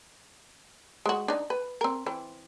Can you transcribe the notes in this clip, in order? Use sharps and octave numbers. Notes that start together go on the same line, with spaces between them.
G#3 F#4
D4 D#4
B4
C4 A#4
E3 C4